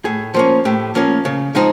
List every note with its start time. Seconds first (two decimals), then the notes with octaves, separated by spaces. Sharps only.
0.05 A2 G#4
0.34 F3 A#3 C#4
0.65 A2 G4
0.95 F3 A#3 C#4
1.25 C#3
1.55 F3 G#3 C4 D#4